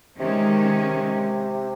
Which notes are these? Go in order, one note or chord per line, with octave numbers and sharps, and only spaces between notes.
C3 D#3 G#3 C#4